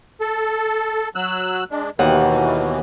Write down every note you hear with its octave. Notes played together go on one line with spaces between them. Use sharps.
A4
F#3 E6 F#6
G#3 D4
D#2 B2 E3 F#5